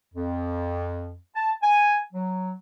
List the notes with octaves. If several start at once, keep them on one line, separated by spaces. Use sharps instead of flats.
F2
A5
G#5
F#3